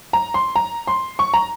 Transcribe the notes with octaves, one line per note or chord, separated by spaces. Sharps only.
A#5
C6
A#5
C6
C#6
A#5